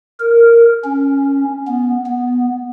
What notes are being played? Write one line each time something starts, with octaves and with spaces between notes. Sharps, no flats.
A#4
C#4
B3
B3